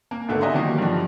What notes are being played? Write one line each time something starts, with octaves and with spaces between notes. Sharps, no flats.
A#3
G#1 D2 D3 A3 B3
G4 D#5 E5 G#5 A#5 C6
D#3 E3 F#3 A#3 G4
G2 F3